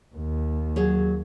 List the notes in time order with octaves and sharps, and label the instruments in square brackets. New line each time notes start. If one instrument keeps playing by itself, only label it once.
[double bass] D#2
[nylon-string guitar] F#3 G#4 C#5